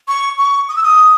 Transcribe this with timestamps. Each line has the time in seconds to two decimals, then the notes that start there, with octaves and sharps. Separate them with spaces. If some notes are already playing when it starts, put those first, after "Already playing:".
0.08 C#6
0.38 C#6
0.69 D#6
0.76 E6
0.83 D#6